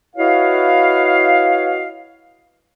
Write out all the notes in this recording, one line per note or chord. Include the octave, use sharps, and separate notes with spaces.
E4 F#4 B4 C#5 D#5 F5